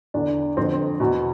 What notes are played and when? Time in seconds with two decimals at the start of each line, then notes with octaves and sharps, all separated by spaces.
0.14 E2 D3 D4
0.57 F2 D3 C4
0.73 C4
1.00 E2 B2